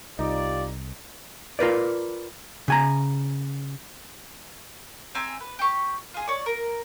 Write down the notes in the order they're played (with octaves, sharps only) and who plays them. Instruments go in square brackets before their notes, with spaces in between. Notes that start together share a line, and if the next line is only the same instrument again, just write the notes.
[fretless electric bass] C2 [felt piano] D#4 [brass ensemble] F4 G4 D5
[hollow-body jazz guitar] F4 A#4 B4 D5
C#3 G#5 A#5
[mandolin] C4 E5 G#5 A#5
B4
G4 C#6
F4 G#4
C#5 D5
A#4